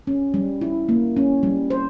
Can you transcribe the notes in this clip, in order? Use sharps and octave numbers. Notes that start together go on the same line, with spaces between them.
C#4
G3
E4
A#3
C#4
G3
C5